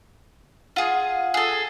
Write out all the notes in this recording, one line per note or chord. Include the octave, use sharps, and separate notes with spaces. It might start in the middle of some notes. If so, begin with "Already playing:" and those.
F4 G#4 F#5
G#4 A4